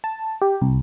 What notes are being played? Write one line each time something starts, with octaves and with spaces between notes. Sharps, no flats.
A5
G4
C2